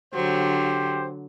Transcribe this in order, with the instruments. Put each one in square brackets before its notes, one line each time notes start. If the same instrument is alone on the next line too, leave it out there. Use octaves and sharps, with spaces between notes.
[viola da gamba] D3 F#3 [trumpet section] G4 C5